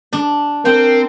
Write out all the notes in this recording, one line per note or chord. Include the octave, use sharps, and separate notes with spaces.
D4
C4 A#4 G5